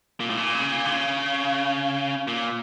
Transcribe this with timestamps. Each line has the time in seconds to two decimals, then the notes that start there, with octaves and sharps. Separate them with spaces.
0.20 A#2
0.30 A2
0.37 A#2
0.54 C#3
0.72 A#2
0.85 D3
0.89 C#3
2.28 A#2